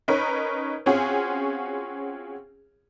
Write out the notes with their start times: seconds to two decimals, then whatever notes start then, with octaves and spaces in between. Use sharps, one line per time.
0.08 C#4 D#4 A#4 B4 C#5
0.86 C4 C#4 F4 F#4 G#4 C#5